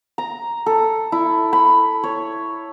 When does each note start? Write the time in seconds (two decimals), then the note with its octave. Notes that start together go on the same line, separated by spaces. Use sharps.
0.18 A#5
0.66 A4
1.12 E4
1.53 B5
2.04 C#5